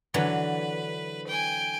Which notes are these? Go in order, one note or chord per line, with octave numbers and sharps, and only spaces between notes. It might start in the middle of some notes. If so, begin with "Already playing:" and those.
D3 E3 F#3 B4
G5 G#5